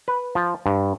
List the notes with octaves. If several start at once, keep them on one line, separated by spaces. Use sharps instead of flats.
B4
F3
G2